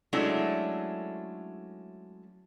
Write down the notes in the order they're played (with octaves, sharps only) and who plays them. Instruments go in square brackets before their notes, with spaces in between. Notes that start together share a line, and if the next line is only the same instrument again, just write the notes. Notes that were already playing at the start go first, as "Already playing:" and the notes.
[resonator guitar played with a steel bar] F#3 G#3 A3 C#4 D4 E4